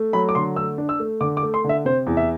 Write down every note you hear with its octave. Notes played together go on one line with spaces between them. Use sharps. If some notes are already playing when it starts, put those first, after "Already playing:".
Already playing: A3
F#3 B5
D6
D3 C6
A3 E6
D4
E6
A3
D3 D6
D6
A3
C6
D3 E5
C3 C5
E2
E5